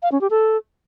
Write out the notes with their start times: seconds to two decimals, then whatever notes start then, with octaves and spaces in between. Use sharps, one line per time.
0.03 F5
0.12 C#4
0.21 G4
0.30 A4